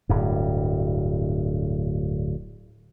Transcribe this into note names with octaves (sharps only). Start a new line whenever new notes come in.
D1 G2